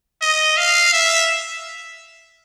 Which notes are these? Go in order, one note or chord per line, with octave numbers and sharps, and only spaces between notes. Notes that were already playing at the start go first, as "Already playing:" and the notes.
D#5
F5
E5